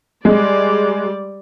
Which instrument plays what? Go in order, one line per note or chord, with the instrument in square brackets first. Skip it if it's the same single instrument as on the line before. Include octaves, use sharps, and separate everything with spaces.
[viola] G3 D5 [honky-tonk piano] G#3